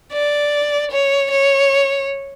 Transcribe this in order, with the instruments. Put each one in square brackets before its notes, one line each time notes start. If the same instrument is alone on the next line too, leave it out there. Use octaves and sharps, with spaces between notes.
[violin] D5
C#5
C#5